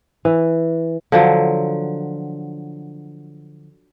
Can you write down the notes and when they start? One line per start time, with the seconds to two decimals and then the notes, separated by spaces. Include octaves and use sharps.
0.25 E3
1.12 D3 F3 F#3